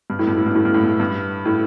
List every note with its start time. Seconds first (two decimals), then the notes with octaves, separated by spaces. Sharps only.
0.10 G2
0.19 A2
0.27 G2
0.37 A2
0.46 G2
0.55 A2
0.65 G2
0.74 A2
0.84 G2
1.00 G2
1.45 A2